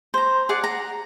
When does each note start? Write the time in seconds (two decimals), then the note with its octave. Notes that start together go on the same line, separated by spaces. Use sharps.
0.14 C5 A#5
0.49 G#4 D5 F#5
0.64 A#5